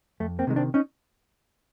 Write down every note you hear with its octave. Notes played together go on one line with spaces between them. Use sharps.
F2 A3
A#3 C4
C3 D#3 G#3
C4 D4
C#4 D#4